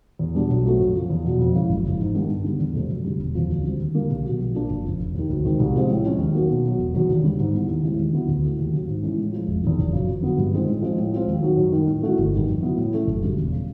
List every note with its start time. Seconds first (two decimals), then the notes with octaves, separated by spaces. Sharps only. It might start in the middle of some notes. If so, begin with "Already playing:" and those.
0.19 E2
0.35 B2 G3 B3 D4
0.50 B1
0.65 A#2 F#3 A3 C4
0.79 F#2
0.95 C#3 F3
1.10 E2
1.25 B2 F#3
1.39 F2
1.55 C#3 E3 G#3
1.69 F#1
1.85 F2 C#3 E3 G#3
1.99 G#2
2.14 D#3 G3 B3 D4
2.29 G2
2.44 D3 G3 B3
2.59 E2
2.74 C3 F3 A3
2.89 F#2
3.04 D3 G3
3.19 E1
3.35 E2 C#3 F3
3.49 D2
3.64 D3 G3 C4
3.79 D#2
3.94 D3 G3 A#3 D4
4.10 C2
4.24 F#3
4.29 B2
4.39 A#1
4.55 A#2 F3 A#3 D4
4.70 F#1
4.84 F2 C#3
4.99 F1
5.15 D#2 D#3
5.30 D2
5.44 C3 D#3 G#3 C4
5.60 C2
5.73 C3 F3 G#3 C4
5.89 A2
6.03 F3 G#3 C#4
6.18 D#2
6.33 D#3 F#3 A#3
6.49 B2
6.64 F#3 B3
6.78 E1
6.94 E2 C3 D#3 F#3
7.09 D#2
7.24 D3 G3
7.39 G#2
7.54 E3 G3 B3
7.68 D#2
7.83 C#3 E3 G#3 C4
7.99 D#2
8.13 D3 F#3 B3 E4
8.28 D2
8.44 C#3 E3 A3
8.59 D#2
8.73 C#3 F#3
8.88 G#2
9.03 E3 G#3 C#4
9.18 A2
9.33 F3 G#3
9.47 F1
9.63 E2 C3 D#3
9.79 F#1
9.92 F#2 C#3 F3
10.08 F2
10.23 D3 F#3 B3
10.38 G2
10.53 D#3 G#3 C4 F4
10.68 A2
10.82 F3 G#3 C4
10.98 A2
11.12 F3 G#3 C4 F4
11.27 D#2
11.43 D#3 F#3
11.57 F#2
11.72 D#3 G3
11.88 A2
12.02 E3 A3 C#4 F#4
12.18 G1
12.33 G2 D#3
12.48 F2
12.62 C#3 F#3 B3 E4
12.77 A2
12.92 E3 A3 C#4
13.07 F#1
13.22 F#2 D3 G3
13.37 E1
13.52 C#3